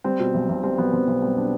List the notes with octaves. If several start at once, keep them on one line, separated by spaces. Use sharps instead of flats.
G3 C4
B2
B1
B1
G3 C4
B1 B3
B1 C4
B1 C4
G3 C4
D4